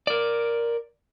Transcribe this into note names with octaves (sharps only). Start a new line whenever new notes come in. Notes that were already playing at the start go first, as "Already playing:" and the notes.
A#4 D5